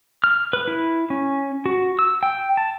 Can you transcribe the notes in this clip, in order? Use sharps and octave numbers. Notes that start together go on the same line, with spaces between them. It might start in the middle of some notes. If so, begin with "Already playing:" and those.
F6
B4
E4
C#4
F#4
E6
G5
A5